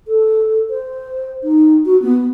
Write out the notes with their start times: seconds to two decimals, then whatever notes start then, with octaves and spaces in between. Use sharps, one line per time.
0.07 A4
0.70 C5
1.44 D#4
1.86 F#4
2.02 B3